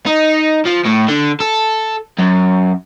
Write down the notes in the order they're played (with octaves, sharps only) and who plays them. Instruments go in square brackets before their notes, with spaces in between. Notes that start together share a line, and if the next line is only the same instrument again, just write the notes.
[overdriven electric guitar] D#4
F3
A2
D3
A4
F#2